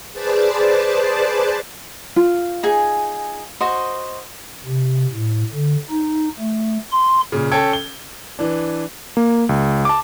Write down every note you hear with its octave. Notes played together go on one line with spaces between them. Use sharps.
G#4 B4 C5 D5 A5
F4
D#4 G#4 G#5
F#4 C5 D#5
C3
A2
D3
D#4
A3
C6
A#2 C#3
C#4 A4 G5 G#6
G7
E3 D4
A#3
C#2
A5 D6